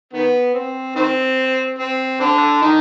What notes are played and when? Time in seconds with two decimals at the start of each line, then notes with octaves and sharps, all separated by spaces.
0.13 D#3 B3
0.54 C4
0.96 D#3 C4
1.79 C4
2.20 D3 D4
2.62 D#3 D#4